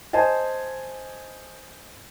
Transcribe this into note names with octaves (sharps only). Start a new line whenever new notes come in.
C5 D#5 G#5 A5